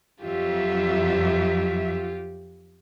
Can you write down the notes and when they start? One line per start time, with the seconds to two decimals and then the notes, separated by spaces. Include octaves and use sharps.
0.22 F2 F#3 F4 G4 E5